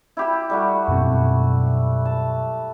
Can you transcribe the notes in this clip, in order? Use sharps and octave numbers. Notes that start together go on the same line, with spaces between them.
E4 G4 B5
G3 A3 F#4
F#2 B2 C4
A5